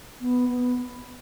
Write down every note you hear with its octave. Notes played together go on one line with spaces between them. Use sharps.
B3
B3